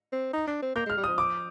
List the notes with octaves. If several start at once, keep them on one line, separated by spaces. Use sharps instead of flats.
C4
D#4
D4
C4
A#3 G6
G#3 F6
G3
F3 D#6
D6